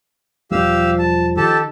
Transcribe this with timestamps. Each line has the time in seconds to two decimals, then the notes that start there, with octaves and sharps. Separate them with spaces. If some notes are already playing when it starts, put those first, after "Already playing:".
0.51 E1 F3 G3 G4 F5 E6
0.99 A5
1.37 D#3 G4 A4 A5